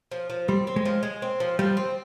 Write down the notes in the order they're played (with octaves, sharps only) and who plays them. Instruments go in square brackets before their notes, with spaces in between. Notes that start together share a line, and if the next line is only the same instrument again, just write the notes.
[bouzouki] F3
F3
[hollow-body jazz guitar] G3 [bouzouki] C4
[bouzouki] C4
[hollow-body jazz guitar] G#3
[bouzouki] F3
G#3
C4
F3
[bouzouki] F3 [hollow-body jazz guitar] G3
[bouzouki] C4